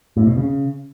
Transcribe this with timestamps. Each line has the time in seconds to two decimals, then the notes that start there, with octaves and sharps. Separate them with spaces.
0.17 A2
0.27 B2
0.38 C#3